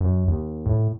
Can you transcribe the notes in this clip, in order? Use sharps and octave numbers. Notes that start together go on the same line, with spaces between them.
F#2
D#2
A2